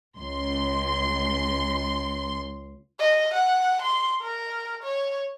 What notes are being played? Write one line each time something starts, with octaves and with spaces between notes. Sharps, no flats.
C#2 C6
D#5
F#5
C6
A#4
C#5